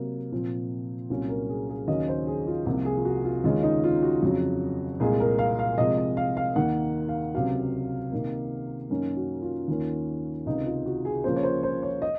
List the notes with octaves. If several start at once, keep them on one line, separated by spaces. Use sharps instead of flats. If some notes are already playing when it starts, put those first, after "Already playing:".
Already playing: C3 F#3 A#3
A#2 F3 C4
C2 A#2 F#3 C#4
A#4
G#4
G#4
D#2 C#3 F#3 C#4 D#5
C5
G#4
F4
C2 C3 F3 A#3 F4
G#4
F4
F#4
F4
D#2 C#3 G#3 C#4 F4
D#4
F4
F#4
F2 C#3 F#3
C2 A#2 G#3 G#4
A#4
F5
F5
C3 F3 G#3 D#5
D#5
F5
F5
D#2 D#3 A#3 F#5
F5
C#2 C3 F#3 F5
C3 D#3 A#3
F#2 D#3 A#3 C#4 A#4
F#4
F4
D#2 D#3 A#3 C#4
C#2 C3 D#3 D#4
F4
F#4
G#4
C#2 C#3 F3 A#3 C#4 C5
C#5
C5
C5
C#5
D#5